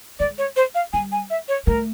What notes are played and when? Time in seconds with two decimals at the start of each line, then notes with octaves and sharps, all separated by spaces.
0.20 G#3 D5
0.38 C#5
0.56 C5
0.75 F5
0.93 G3 G#5
1.12 G#5
1.30 E5
1.48 C#5
1.67 A3 A#4